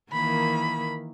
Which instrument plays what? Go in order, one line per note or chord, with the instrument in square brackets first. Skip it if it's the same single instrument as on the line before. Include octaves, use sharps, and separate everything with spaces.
[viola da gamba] D#3 E3 A#3 [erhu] B5